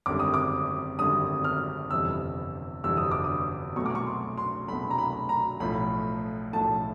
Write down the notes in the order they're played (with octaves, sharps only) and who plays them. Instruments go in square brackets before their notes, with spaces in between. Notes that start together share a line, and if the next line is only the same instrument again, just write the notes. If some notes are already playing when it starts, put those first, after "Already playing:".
[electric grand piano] G#1 F#2 D3 G3 C4 [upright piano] D6
[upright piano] D#6
D6
[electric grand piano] G#1 F#2 D3 G3 C4 [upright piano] D#6
[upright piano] F6
[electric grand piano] G1 F2 C3 E3 G3 [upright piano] E6
[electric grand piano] G1 F2 C3 E3 G3 [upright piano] E6
[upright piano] D#6
D6
D#6
[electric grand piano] C2 B2 F#3 A3 [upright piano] C#6
[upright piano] D6
C#6
C6
C6
[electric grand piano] C2 B2 F#3 A3 [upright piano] B5
[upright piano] A#5
B5
A#5
[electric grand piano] B1 A2 F3 A3 [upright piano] B5
[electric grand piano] B1 A2 F3 A3 [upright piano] A5